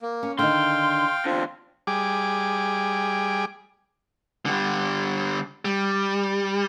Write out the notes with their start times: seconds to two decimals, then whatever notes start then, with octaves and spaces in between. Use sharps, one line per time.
0.01 A#3
0.23 C#4
0.39 D3 D#3 D#4 F5 G5 C6
1.26 E2 D3 C4 F4
1.87 G3 G#4 D6
4.46 D3 G3
5.65 G3